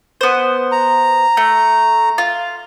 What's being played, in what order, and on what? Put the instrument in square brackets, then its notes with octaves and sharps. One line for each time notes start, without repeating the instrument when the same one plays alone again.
[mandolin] B3 C5
[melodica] A#5
[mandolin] A3
F4